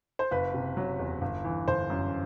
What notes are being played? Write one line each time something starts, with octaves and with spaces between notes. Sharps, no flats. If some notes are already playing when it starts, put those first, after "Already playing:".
C5
F#1 B4
C3
F#3
E2
G1
E3
G1 C5
F#2